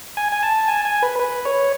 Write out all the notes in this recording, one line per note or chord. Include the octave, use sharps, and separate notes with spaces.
G#5
G#5
A5
G#5
G#5
B4
B4
C#5